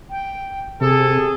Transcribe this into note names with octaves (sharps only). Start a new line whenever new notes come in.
G5
C3 G#4 A4